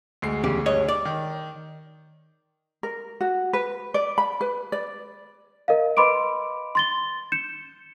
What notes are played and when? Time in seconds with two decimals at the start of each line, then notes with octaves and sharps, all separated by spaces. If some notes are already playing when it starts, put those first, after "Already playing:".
0.22 D2 G#3 C7
0.44 E2 C#3 G4
0.66 G2 C#5 D#5
0.88 D5
1.05 D#3
2.83 A#4
3.21 F#4
3.53 B4
3.94 D5
4.18 B5
4.41 B4
4.72 D5
5.68 A#4 D#5 F5
5.97 B4 D#5 B5 C6 D6 D7
6.75 C6 A6 G7
7.32 G6 C#7 E7